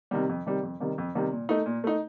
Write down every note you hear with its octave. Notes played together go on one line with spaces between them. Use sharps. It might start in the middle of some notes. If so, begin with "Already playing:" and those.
C3 D#3 G3
F2
C3 D#3 G3
F2
C3 D#3 G3
F2
C3 D#3 G3
A#2
A3 D#4
A#2
A3 D#4